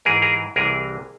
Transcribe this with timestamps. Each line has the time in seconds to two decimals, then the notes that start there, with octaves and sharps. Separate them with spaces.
0.05 G#2 E3 G#4 A#4
0.22 G#4 A#4
0.56 C2 C3 E3 G#4 A#4